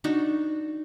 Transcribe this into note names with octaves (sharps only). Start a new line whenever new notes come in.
D4 D#4 F#4